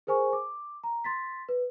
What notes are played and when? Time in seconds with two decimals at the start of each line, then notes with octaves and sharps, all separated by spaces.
0.07 G#4 A#4 C5 G#5 C#6
0.33 D6
0.84 A#5
1.04 C6 A6 B6
1.49 B4